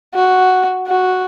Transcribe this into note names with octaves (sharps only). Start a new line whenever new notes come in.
F#4
F#4